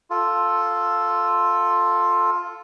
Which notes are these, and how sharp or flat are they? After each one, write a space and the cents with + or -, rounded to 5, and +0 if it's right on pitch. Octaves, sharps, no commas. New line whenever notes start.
F4 +5 A4 +0